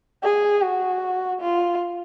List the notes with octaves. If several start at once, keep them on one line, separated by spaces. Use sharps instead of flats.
G#4
F#4
F4